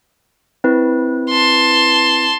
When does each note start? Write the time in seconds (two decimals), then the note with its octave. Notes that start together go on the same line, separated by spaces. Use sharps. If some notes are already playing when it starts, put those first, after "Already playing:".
0.64 C4 E4 B4
1.30 A5 C6